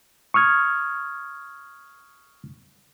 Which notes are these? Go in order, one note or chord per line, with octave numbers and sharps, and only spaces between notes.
C#6 D#6 F6 G#6